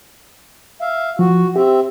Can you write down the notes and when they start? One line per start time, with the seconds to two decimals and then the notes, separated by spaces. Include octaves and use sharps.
0.81 E5 F5
1.19 F3 F#4
1.56 C4 G4 E5